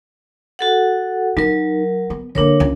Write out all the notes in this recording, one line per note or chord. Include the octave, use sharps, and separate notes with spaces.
F#4 A4 F#5
F#3 D#4 A#4
B3
D3 A#3 D4 A#4 C#5
C#2